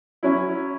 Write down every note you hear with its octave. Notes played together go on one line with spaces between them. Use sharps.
F#3 C#4 E4